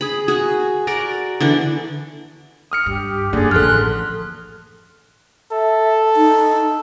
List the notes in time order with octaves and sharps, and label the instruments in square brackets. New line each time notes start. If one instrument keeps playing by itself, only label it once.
[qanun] G#4 B5
F#4 G#4
F#4 A#4 D5
D3 E3 D4
[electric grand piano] D#6 F6 C#7
[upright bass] G2 [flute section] G4
[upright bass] F#2 A#3 [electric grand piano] D3 [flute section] G#4 D5
[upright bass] A1 F3 [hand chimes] A4 F6 [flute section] C6 F#6
[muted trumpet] A4 [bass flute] E5
[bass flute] D#4